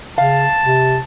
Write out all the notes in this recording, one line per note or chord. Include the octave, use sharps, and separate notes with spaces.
C#3 F5 A5
C3